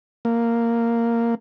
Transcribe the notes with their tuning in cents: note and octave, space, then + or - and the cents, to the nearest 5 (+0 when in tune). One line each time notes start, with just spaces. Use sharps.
A#3 -5